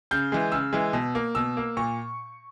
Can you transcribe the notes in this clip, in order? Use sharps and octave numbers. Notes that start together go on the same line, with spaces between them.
C#3 G6
E3 G#3
C#3 E6
E3 G#3
B2
A#3
B2 E6
A#3
A#2 C#6